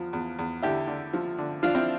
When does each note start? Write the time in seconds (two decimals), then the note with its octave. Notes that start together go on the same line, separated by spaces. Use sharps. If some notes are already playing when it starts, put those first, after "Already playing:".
Already playing: E2 F3
0.13 E2
0.39 E2
0.62 D3 E4 G4
0.87 D3
1.13 F3
1.38 D3
1.63 F3 D4 F4
1.75 C4 E4